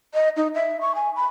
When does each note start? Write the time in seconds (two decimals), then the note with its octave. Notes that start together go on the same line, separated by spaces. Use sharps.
0.14 D#5
0.37 D#4
0.55 E5
0.81 C#6
0.95 G#5
1.16 B5